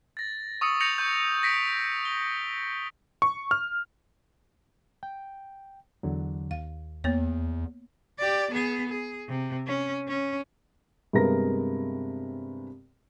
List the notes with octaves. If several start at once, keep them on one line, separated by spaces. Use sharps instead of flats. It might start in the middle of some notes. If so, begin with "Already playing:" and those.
A6 A#6
C#6 D#6 E6 C#7
G6 A#6 C#7 F7 F#7
C#6 G6
A#6 B6 D7
G7
C#6
F6
G5
E2 D3 F#3
D#2 F5
E2 A#3 B3 C#5
G4 D5
B3 G#4
G#4
C3
C#4
C#4
G2 C3 G#3 B3 A#4 A#6